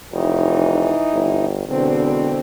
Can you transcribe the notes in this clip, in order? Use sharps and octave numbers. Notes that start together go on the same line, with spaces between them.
F1 E3 D#4
G1
E1 B2 D3 C4